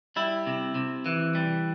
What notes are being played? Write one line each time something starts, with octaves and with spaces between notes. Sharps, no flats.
G3 E4
C3
C3
E3
G3